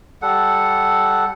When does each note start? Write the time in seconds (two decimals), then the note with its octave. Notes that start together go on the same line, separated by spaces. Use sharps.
0.22 G3 A4 F#5